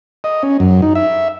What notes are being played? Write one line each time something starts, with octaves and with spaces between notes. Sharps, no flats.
D#5
C#4
F#2
D#4
E5